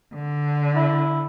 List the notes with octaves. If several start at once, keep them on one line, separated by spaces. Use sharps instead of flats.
D3
E4